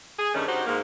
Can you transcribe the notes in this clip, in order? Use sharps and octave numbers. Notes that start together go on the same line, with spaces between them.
G#4
G2 D#3 A3 C#4
D#4 F#4 G4 C5
G#2 A#3